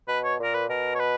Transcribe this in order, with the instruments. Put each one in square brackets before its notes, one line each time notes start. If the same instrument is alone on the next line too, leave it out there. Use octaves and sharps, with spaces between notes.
[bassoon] B2 [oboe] B4
[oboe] C#5
[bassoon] A#2 [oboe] A#4
[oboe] B4
[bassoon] B2 [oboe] A#4
[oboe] C#5
B4